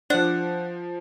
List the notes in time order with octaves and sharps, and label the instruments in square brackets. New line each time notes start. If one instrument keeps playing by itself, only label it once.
[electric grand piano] F3 C5 [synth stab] D4 [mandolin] F#5